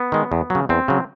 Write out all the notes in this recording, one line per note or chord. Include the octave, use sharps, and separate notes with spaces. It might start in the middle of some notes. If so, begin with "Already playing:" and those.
Already playing: B3
D#3 G#3
E2
C#3 F#3
E2 C4
C#3 F#3